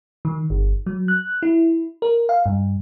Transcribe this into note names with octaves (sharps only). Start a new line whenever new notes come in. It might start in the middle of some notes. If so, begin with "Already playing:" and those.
D#3
G1
F#3
F#6
E4
A#4
F5
G2